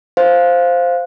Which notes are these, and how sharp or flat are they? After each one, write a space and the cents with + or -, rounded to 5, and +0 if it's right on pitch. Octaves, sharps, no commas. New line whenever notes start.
C5 +0 F5 +0